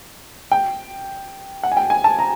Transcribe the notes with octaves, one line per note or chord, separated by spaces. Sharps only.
G5
F#5
G#5
G5
G#5
A5
A#5